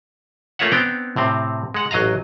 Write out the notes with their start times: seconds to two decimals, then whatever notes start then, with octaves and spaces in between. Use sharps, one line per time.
0.59 A3 A#3 F4 C#5 E5 F#5
0.71 B3 C4 D4 G5 A#5
1.16 A2 C3 C4
1.74 G#3 F#5
1.91 A1 F#3 D#5 F5 A#5